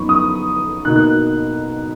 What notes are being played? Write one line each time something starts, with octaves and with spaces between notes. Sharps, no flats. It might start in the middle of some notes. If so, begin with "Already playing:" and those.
Already playing: F#2 F3 B3 D#4 B5 C#6
D#6
B2 A#3 D#4 F#6
F#6